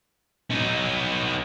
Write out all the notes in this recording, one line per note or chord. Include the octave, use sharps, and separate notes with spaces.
B3 D#4